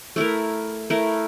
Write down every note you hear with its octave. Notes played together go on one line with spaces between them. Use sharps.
A3 E4 A#4
A3 E4 A#4